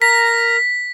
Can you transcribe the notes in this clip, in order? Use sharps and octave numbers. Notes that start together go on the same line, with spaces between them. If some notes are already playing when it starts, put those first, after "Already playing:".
A#4 A#5 B6